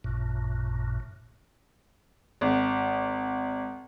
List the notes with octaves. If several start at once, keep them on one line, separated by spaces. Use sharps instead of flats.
A1 F#2 A#2
G#1